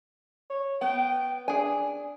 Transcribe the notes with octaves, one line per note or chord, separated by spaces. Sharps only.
C#5
B3 G5
D4 G#4 G#5